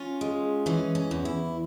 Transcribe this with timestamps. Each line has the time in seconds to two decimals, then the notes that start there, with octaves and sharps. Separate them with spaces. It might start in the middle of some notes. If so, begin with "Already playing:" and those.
Already playing: C#4 F4
0.21 G#3
0.66 E3 C#4
0.95 C#4
1.11 E2
1.25 E4